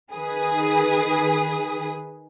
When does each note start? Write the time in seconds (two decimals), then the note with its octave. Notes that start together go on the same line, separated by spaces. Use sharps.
0.12 D#3 G#4 B4 D#6